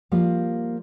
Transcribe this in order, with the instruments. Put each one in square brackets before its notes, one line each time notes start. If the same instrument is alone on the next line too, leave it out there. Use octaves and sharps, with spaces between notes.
[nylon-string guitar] F3 G3 A#3